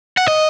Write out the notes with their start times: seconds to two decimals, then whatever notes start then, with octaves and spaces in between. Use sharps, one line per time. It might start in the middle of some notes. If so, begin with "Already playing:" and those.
0.17 F#5
0.28 D#5